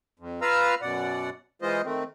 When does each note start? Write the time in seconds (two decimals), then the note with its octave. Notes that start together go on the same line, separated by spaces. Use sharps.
0.19 F2
0.42 F4 B4 F5 A#5 E6 F6
0.82 F#2 B2 D5 F#5
1.62 E3 G#3 F4 C5 D#5
1.85 D#3 A3 C4